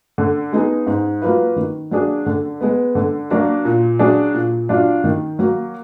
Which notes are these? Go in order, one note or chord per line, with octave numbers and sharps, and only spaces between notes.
D3
G#3 B3 D#4 G#4
G#2
F#3 A#3 F4 B4
D#3
F#3 A#3 D4 G#4
D3
G#3 B3
D3
F#3 A#3 D4 F#4
A#2
F#3 D4 G#4
A#2
F#3 D4 F4
D#3
F#3 A#3